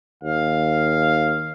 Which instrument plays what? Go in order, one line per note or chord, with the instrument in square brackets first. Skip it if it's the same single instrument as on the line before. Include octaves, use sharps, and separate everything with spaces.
[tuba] D#2 [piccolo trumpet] F5